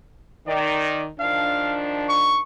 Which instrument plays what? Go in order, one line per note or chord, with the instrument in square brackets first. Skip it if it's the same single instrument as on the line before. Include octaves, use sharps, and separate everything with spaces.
[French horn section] D#3 [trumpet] D5
[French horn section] D#3 F3 D4 [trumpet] F5
[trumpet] C#6